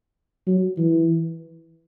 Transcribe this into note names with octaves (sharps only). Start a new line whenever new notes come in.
F#3
E3